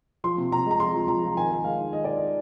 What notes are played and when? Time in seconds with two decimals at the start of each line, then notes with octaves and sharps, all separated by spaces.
0.24 F3 C6
0.38 C3
0.52 C3 A#5
0.66 G#3 A#5
0.80 F3 C6
0.95 F3
1.08 F3 A#5
1.23 F3
1.37 D#3 G#5
1.51 D#3
1.64 G#3 F5
1.80 D#4
1.93 D#3 D#5
2.05 D#3 D5
2.17 D#5
2.22 D#4